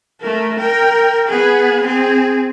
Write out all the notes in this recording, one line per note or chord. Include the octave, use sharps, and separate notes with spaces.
A3 A#4
A#4 G5
B3 G#4
C4 G#4